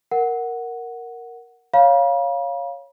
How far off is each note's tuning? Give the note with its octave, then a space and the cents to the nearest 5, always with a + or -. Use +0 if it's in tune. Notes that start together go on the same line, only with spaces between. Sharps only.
A#4 +0 F#5 +0
C#5 +0 F5 +0 B5 -45